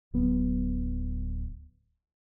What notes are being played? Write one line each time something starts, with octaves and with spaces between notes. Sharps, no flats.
D1 F#3 B3